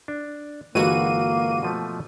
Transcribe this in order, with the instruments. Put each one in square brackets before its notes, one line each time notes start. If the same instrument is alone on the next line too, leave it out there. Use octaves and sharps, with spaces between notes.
[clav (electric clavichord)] D4
[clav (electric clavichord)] G1 E3 [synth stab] G#3 F#4 D#7 [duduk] A#3
[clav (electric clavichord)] B2 F3 A3